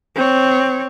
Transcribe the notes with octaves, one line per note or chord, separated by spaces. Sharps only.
C4 C#5